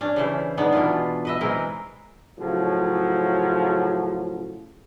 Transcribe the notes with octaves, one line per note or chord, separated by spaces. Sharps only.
C#4 D4
C#3 E3 C5
D#3 G#3 B3 D4
B2 E3 F4
B4 D#5 E5
E3 G#3 C4 A#4
A2 C#3 F3 F#3